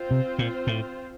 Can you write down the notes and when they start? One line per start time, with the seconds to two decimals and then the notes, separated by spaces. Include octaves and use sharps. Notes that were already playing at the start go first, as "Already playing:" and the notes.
Already playing: C4 F4 C5
0.11 C3
0.39 A#2
0.67 A2